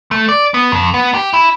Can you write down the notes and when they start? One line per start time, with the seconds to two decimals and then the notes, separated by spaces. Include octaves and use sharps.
0.11 A3
0.29 D5
0.54 B3
0.72 F2
0.94 B3
1.14 G4
1.33 E4